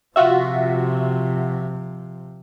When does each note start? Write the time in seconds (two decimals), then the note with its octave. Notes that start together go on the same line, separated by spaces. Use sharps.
0.16 C3 F3 F4 F#4 E5